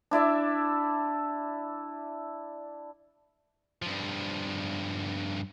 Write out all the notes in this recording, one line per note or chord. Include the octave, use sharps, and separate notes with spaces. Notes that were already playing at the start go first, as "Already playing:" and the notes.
D4 E4 D5 E5
G2 F3